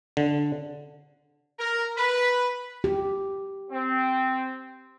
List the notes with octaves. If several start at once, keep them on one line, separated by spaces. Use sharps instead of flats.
D3
A#4
B4
G4
C4